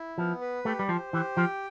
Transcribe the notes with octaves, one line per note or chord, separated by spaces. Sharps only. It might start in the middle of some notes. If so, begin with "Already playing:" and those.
Already playing: E4
F3 B3
B4
A3 G4
G3
F3 C5
E3 G4
F3 G5